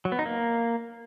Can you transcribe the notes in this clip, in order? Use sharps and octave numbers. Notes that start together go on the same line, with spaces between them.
F#3
B3
D#4
A#3